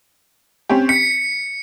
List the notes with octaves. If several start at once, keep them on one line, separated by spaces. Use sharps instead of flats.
C4 C#4 G4
B6 C#7